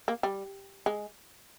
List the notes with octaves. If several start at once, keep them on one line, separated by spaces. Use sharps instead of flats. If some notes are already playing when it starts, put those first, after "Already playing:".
A#3
G3
G#3